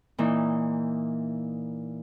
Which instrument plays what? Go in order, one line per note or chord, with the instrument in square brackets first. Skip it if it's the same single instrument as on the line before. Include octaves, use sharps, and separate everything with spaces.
[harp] A#2 E3 D#4